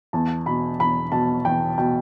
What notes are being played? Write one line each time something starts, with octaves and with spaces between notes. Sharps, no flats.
E2 A5
B2 B5
E2 B5
B2 A5
E2 G5
B2 G5